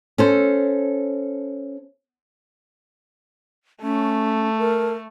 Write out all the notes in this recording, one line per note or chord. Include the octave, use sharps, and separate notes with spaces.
C#4 A4 C5
A3 C#4
A#4